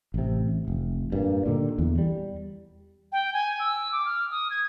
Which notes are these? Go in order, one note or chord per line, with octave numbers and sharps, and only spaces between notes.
A1 C3
F1
G2 A#2
A#2 D3 D#3
E2
G3
G5
G#5
E6
D6
F6
D#6
G#6